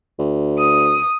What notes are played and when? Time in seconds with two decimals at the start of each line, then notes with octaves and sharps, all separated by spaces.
0.19 D2
0.58 D#6